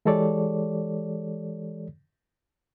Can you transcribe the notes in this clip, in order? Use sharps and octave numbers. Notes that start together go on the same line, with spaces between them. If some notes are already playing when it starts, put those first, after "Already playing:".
E3 G#3 G4 A4 C#5 D5